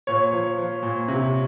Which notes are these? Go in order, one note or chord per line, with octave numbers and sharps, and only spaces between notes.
A#2 C#5
F3
F3
A#2
C3